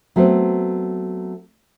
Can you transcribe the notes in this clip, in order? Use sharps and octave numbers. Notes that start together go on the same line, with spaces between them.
F#3 A3 B3 C4